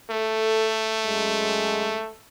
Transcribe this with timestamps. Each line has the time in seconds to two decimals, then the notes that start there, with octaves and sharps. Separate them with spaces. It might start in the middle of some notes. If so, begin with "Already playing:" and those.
0.10 A3 A4
1.06 F#2 G#3